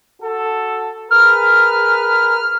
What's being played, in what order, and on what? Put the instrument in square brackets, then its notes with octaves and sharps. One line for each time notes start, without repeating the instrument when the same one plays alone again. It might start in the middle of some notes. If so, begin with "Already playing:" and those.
[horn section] F#4 A4
[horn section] G#4 A#4 B4 [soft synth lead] F6